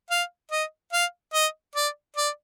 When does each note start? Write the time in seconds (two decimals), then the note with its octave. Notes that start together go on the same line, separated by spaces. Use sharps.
0.11 F5
0.51 D#5
0.93 F5
1.34 D#5
1.76 D5
2.17 D5